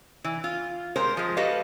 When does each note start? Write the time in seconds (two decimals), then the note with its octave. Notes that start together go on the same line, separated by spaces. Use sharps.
0.24 E3
0.44 F4
0.96 G#3 G4 A#4 C5 A#5
1.17 F3 G#3
1.37 F#4 G4 A4 B4 D#5 F5